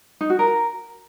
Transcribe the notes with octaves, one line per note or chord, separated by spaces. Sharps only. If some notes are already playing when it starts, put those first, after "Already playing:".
D#4
F#4
A#4